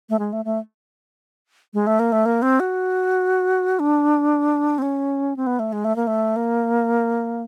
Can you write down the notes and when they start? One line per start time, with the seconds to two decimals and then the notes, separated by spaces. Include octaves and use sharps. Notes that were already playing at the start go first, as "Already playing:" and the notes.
0.10 A3
0.19 G#3
0.33 A3
0.45 A3
1.74 G#3
1.87 A3
1.99 A#3
2.12 A3
2.26 A#3
2.42 C4
2.60 F#4
3.79 D4
4.78 C4
4.82 C#4
5.37 C4
5.47 B3
5.59 A3
5.73 G#3
5.85 A3
5.96 A#3
6.07 A3
6.36 A#3